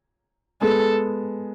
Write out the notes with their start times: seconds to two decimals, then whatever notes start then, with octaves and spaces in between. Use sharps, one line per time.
0.61 G#3 B3 A4